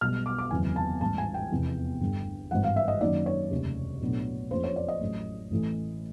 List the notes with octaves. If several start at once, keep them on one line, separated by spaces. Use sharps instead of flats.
B1 B2 G3 F6
D6
D6
F#1 E2 C3 D#3 F#3 G#5
A5
A1 G#2 E3 G3 A5
G#5
G5
F1 E2 C3 F3
G1 G2 D3
G#1 G2 E3 F#5
F5
E5
D#5
F#2 D#3 F#3 A#3 D#4 D5
C#5
F1 D#2 C#3
B1 A2 F#3 B3 D4
F#1 F2 C#3 F3 A#3 C5
C#5
D5
D#5
A1 A2 F#3
A1 A2 E3